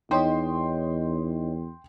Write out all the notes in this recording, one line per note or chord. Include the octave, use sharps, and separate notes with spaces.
E2 D#4 C#5 D#5 G5 C6